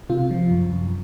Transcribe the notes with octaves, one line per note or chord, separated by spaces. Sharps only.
C3 F4
F3
F#2
F#2